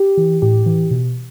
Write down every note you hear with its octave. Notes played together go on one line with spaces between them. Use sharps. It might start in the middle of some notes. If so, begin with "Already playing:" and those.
Already playing: G4
E3
A2 G4
E3
B2